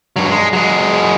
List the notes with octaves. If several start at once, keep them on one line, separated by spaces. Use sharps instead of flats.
G2 F#3
G#3
F#3 G#3